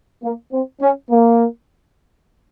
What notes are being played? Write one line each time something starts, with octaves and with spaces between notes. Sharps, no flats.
A#3
C4
C#4
A#3